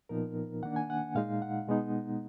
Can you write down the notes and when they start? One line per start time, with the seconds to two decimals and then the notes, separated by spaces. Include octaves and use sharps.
0.09 A#2 F3 B3 D#4 A#4
0.63 D#3 A#3 D4 F#5
0.76 G#5
0.90 F#5
1.15 A#2 G#3 D#4 F5
1.42 F#5
1.67 B2 G#3 B3 D#4